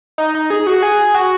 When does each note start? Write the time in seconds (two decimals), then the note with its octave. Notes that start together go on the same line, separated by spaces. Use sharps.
0.18 D#4
0.35 D#4
0.50 G#4
0.67 F#4
0.83 G#4
1.15 F#4